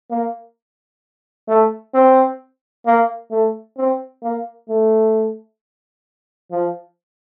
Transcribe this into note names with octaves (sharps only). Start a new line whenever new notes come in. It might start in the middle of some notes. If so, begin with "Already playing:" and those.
A#3
A3
C4
A#3
A3
C4
A#3
A3
F3